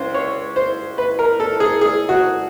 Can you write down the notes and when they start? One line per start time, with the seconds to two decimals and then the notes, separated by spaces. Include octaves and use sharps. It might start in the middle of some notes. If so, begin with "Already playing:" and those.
Already playing: C#2 C5
0.14 C#5
0.56 C5
0.98 B4
1.19 A#4
1.40 A4
1.60 G#4
1.81 G#4
2.09 F#4